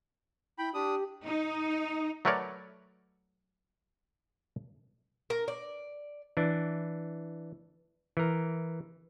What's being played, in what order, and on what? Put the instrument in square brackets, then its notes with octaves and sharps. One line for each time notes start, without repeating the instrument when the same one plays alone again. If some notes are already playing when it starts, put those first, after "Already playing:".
[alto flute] E4 [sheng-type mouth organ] G5 B5
[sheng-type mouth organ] D4 D#6 [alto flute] G4
[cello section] D#4
[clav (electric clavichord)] F#3 A3 A#4 B4 C#5 D5
[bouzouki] A#4
D5
[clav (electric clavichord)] E3 D4
E3 A#4